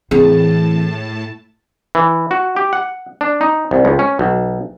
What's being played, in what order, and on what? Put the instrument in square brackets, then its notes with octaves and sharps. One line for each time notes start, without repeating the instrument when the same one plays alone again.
[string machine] A2 A5 [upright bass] E3 C4 [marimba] G#4
[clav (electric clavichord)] E3
F#4
G4
F#5
D4
D#4
C2
C#2
C#4
B1